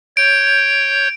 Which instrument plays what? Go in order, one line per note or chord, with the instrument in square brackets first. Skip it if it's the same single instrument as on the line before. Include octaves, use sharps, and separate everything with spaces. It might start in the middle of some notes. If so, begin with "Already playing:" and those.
[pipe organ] C#5 G6 [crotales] D7